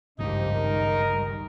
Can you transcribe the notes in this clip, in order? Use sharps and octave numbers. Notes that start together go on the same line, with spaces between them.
G#1 C#2 G2 D#3 F3 D#4 G4
D#3 G3 G#3 A#4